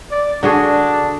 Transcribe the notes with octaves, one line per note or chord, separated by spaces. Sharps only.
D5
D3 D4 F#4 G#4